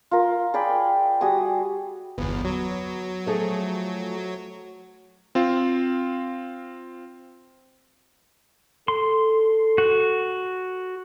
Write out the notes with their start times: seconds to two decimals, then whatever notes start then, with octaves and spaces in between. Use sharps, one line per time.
0.11 F4 A#4
0.54 G#4 D5 G5 B5
1.21 G3 F#4 G#4 D#6
2.18 G1 E2 B3
2.45 F#3
3.26 F3 A3 G#4
5.35 C4 F4
8.88 A4 C6
9.78 F#4